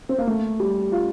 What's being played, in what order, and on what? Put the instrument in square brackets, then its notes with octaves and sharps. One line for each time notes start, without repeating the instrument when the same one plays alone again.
[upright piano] C4
A#3
A3
G3
F4